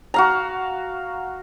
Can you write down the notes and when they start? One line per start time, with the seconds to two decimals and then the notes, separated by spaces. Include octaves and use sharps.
0.14 F#4 F5 A#5